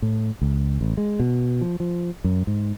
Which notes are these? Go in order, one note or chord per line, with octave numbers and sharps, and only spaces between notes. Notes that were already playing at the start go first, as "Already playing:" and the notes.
A2
C#2
A1
G#3
B2
F3
F3
F#2
G#2